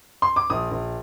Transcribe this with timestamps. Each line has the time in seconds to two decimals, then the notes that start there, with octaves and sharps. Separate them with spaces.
0.22 C6
0.36 D6
0.50 A#1 D#6
0.71 A#1